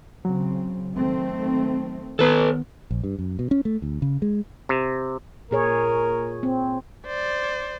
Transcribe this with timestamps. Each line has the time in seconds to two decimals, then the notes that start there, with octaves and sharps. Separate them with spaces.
0.25 C#3 F#3 C4
0.94 D#3 A3 C4
2.19 D#3 B3 A4 B4
2.91 A#1
3.04 G2
3.19 F#2
3.39 B2
3.51 C#4
3.65 A3
3.82 D2
4.02 C#3
4.22 G#3
4.69 C3
5.51 A#2 G#4 A#4 C#5
6.43 C4
7.06 C5 D5